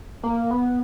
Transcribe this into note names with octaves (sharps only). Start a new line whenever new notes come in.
A#3
B3